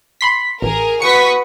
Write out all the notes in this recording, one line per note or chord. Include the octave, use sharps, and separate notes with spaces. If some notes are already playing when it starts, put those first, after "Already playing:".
B5 C6 B6
A1 G#4 A#4
F#4 B4 C#6 D#6 B6 C#7